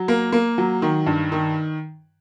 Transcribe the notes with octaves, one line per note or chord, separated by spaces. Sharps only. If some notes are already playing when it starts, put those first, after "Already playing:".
Already playing: F#3
A#3
A#3
F#3
D#3
G2
D#3